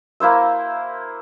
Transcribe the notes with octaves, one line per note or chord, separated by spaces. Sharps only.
A#3 E4 C5 E5